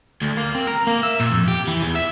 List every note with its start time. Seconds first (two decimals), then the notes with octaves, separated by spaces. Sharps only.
0.22 D2
0.37 A#3
0.55 C4
0.67 A#4
0.87 A#3
1.03 E5
1.20 A#2
1.32 F2
1.48 G4
1.68 E3
1.83 E2
1.96 E5